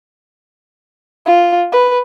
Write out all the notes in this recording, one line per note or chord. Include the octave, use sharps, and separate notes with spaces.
F4
B4